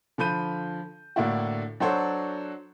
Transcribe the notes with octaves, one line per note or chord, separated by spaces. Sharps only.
D3 F3 B5 G6 D#7
A2 D3 A#3 D4 E4 F#4
F#3 D4 F#4 A4 C5 C#5